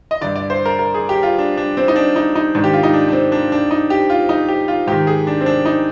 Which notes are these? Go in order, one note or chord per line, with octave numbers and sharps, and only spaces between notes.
D#5
G2 D3 D5
D5
C5
A#4
A#4
G#4
G4
F4
D4
D4
C4
D#4
D4
D#4
D#4
G#2 D#3 D4
G4
F4
D#4
D4
D4
C4
D4
D4
D#4
G4
F4
D#4
G4
F4
G#2 D#3 G4
G#4
D4
C4
D4
D#4